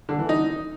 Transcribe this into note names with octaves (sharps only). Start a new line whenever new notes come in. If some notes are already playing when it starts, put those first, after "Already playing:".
D3
E3
D#4